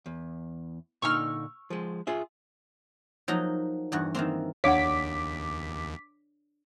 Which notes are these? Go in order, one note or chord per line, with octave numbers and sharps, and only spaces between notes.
E2
A#2 D3 D#4 C#6 E6 F6
F3 G#3
F4 G#4 E5
F3 F#3 A#3 D#4
E2 G2 F#4
D#3 E3 A#3 C4
D#2 D4 C#5 F5 F#5 D6 B6